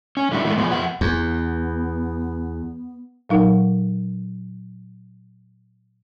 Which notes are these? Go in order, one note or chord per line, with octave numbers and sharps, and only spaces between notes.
C#4
D3 G3 E4 F#4
D#3 E3 G#3 A3
B2 F3 B3 G#4 B4
F2 F#5
E2 B3
A#2 F#3 D#4 A#4 F#5